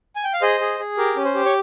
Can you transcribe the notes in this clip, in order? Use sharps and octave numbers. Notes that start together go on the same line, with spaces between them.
G#5
G5
F5
G#4 C5 D#5
G#4
G#4
G4 A#4
C#4
C5
G4
C#5